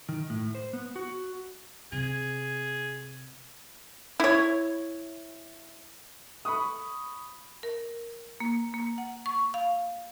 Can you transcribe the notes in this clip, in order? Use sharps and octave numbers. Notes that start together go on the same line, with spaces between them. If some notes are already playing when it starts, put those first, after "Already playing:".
D#3
A2
C5
B3
F#4
C3 G#4
E4 C#5
B5 C#6 D#6
A#4
A#3
A#3
F#5
C#6
F5